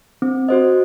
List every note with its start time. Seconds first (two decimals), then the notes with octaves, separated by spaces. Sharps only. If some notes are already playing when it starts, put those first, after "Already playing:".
0.22 C4
0.48 F#4 C5 D#5